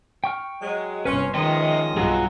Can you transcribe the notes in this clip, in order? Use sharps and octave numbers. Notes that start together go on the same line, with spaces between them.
G5 C#6 F6
F#3 G#3
G1 C3 C#4 B4 C6
D#3 F3 G#3 C#4 D#5 E5 G5
B1 G2 F#3 F4 G#4